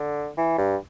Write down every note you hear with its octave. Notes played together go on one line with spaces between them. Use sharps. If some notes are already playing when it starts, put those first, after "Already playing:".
Already playing: D3
E3
G2